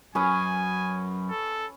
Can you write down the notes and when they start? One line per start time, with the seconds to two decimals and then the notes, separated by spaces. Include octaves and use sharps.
0.15 F#2 F#3 C#4 B4 G#5 D#6
1.30 A4